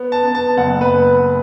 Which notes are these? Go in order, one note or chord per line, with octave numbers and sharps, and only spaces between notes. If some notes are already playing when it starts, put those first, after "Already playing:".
Already playing: B3
A5
B3
A5
F#1 F#5
B4